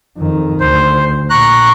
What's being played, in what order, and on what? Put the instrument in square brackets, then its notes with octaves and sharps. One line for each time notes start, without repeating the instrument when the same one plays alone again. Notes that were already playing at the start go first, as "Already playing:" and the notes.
[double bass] F2 D#3
[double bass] D2 [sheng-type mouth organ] C5
[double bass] A#2 [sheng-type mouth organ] A#5 F#6 [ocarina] C#6